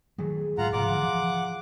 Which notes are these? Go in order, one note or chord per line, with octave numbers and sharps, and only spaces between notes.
D#3 F#3 A3 G#4
G#2 F#3 F4 F#5 A#5
G#2 C3 F3 F5 F#5 A#5 C6 D6
D3 F3
E3 F3